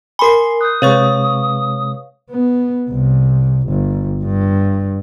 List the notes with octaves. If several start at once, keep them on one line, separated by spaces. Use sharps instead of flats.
A#4 G#5 B5 C6 C7
D#6 F#6 G6
C3 G#3 B4 C#5 F5 C#6
B3
C2
G1
G2